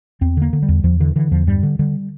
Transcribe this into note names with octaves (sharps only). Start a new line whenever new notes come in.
E2 C4
D3 A#3
D3
G3
E2
E2 F3
D3 E3
D3 E3
E2 F3
G2 G3
D3
D3 G3